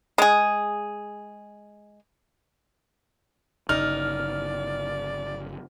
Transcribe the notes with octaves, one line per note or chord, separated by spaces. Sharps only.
G#3 G#4
G1 C#3 D#4 D5 F6